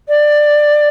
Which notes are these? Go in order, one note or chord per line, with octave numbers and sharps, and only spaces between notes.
D5